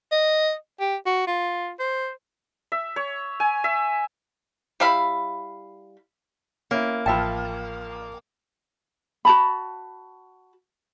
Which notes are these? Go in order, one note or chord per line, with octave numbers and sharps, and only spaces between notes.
D#5
G4
F#4
F4
C5
E5
C#5
G#5
E5
G3 E4 F5 B5
A#3 C#4 E4
A1 F3 E5 G5 A5 B5
F#4 A5 B5